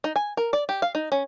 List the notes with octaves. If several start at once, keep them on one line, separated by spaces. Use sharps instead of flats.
D#4
G#5
A#4
D5
G4
F5
D#4
C#4